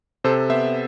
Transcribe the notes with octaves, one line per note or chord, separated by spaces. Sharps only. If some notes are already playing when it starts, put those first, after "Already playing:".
C3 A4 C5
B3 C5 E5